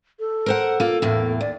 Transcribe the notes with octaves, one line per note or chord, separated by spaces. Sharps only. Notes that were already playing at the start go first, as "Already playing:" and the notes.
A4
A#4 C5 F#5
A#3 F4
E2 A2 A#3
D#2 D5